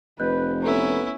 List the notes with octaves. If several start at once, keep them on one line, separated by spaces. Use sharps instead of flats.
F1 B4 D#5 F#6 G6
B3 C#4 E4 A4 B4 A#5